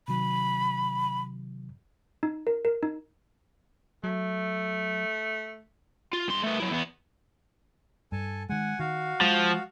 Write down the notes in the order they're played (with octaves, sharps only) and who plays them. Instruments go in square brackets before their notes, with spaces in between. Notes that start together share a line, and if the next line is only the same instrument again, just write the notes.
[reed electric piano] C3 D#3 F#3 [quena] B5
[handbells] D#4
A#4
A#4
D#4
[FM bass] F#3 [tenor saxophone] A3
[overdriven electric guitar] F4
G2 C6
A3 B3
F#3 E4
E2 B3
[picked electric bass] G2 [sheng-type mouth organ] A4 G#5 A5
[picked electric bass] D#3 G#3 [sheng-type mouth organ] F#5 G#5
[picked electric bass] D#3 [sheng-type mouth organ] F#4 F5
[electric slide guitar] F3 [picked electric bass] G#3